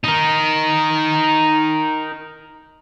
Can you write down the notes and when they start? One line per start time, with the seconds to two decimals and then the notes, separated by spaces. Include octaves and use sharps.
0.04 D#4 A#4